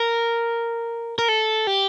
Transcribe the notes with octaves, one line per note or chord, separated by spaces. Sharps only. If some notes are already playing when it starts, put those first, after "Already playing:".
Already playing: A#4
A#4
A4
G4